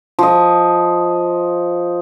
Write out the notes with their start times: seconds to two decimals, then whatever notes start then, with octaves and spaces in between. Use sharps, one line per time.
0.19 F3 D#5